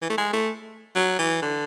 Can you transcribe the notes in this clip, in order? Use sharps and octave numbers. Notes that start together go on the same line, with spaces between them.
E3
A3
G#3
A3
F#3
E3
D3